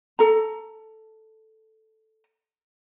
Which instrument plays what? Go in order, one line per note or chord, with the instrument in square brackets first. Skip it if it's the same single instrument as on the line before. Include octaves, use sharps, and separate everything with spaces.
[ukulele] A4 A#5